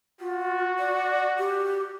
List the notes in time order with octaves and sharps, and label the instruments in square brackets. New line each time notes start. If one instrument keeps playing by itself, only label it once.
[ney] F4 [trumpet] F#4
[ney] D5
G4